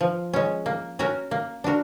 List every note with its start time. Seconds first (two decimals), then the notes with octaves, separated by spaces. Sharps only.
0.01 F3
0.33 G#3 C#4
0.66 A#3
0.99 C#4 F#4 A#4
1.31 A#3
1.64 D4 F#4 A#4